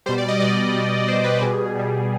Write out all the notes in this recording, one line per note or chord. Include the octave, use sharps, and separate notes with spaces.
B2 G3 C5
D5
D#5
B2 G3 D5
B2 G3
B2 G3 C5
B4
B2 G3 G#4
B2 G3